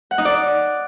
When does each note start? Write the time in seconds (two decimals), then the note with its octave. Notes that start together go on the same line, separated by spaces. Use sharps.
0.11 F#5
0.18 D#4
0.25 D5